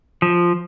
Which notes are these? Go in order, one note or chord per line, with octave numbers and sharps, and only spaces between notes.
F3